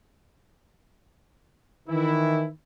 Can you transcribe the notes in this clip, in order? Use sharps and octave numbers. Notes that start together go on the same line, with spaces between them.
D#3 E3 E4